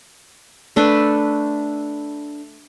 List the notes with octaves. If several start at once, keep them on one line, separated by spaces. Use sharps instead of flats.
A3 D4 A4 B4